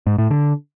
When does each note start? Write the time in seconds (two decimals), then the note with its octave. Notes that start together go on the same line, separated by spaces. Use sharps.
0.07 G#2
0.18 A2
0.30 D3